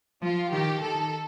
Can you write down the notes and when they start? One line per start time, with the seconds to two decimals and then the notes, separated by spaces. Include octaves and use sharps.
0.22 F3 F4
0.52 D#3 G4
0.81 D#3 A4